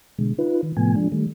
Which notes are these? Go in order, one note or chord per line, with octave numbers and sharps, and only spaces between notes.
B2 D3 G#3
D#4 F4 B4
D#3
A2 C3 F3 A3 B3 G#5
F3 G#3 D4
D#3 G3 A3